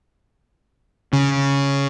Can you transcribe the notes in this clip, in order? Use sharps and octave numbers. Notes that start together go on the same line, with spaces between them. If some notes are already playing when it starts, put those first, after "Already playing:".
C#3